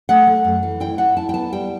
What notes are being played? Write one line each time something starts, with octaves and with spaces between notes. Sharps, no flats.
A3 F#5
A3
F#2
E3
E4 G5
E4 F#5
E4 A5
G5
B3 A5
G3 G5